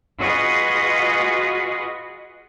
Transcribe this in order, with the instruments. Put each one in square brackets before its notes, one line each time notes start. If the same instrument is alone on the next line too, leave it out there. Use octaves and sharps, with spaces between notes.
[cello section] F4 F#4 G#4 B4 D#5